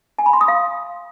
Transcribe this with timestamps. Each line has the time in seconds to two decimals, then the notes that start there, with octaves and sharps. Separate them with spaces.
0.19 G#5
0.26 B5
0.33 C6
0.41 D#6
0.48 F5